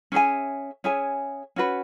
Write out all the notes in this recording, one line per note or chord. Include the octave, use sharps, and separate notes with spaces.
C#4 G#4 E5 G#5
C#4 G#4 E5 G#5
C#4 F#4 B4